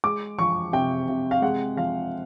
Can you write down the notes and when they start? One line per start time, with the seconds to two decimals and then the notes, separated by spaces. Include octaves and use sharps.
0.04 G#3 D6
0.38 F3 C#6
0.73 C3 G5
1.08 C3
1.31 F5
1.42 G#3 F#5
1.77 F3 F5